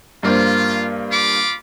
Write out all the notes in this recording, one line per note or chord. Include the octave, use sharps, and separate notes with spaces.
G2 A#3 F4 C5
F4 B5 D6